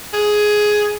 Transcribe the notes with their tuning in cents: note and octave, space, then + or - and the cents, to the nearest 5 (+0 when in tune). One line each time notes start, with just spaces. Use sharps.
G#4 +10